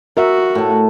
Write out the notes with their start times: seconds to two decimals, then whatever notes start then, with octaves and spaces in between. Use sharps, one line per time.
0.17 F#4 A#4 E5
0.55 A2 A5